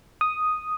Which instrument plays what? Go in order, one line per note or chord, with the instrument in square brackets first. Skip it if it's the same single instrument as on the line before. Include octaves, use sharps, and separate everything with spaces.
[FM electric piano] D#6